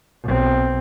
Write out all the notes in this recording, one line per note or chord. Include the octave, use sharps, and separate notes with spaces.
B1 C4